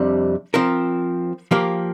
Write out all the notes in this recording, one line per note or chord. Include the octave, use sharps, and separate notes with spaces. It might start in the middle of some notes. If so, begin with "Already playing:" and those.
Already playing: F2 C3 G3 D4
F3 C4 A#4
F3 A#3 G4 A#4